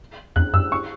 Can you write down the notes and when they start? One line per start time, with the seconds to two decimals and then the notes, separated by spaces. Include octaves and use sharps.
0.36 E2 F#6
0.53 F#2 E6
0.72 C#6